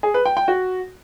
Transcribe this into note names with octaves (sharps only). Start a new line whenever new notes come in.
G#4
B4
G5
G5
F#4